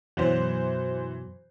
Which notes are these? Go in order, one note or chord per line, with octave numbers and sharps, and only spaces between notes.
F#2 B2 E3 F#3 C5